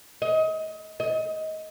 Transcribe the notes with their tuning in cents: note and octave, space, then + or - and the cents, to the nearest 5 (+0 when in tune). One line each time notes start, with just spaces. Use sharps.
D#5 +30
D#5 +15